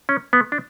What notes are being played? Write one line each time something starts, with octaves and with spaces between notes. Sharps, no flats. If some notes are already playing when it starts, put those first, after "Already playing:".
C#4
B3
D4